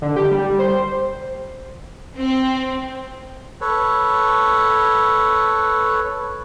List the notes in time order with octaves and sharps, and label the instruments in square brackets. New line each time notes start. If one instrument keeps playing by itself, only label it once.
[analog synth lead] D3
G4
G3
C5
[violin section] C4
[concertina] A4 B4 C#5